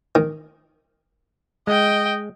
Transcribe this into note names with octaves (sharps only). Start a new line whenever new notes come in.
D#3
G#3 D#5 G5